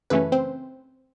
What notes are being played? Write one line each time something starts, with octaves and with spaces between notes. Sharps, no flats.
F#2 C#3 E3 A3 C#4 B4
C4 C5